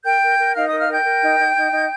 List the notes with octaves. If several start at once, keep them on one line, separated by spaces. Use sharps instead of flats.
A#4 G5 G6
A#4
A#4
D#4 F5 F6
A#4 D#5 D#6
F5 F6
A#4 G5 G6
A#4
D#4
D#4
D#4
D#4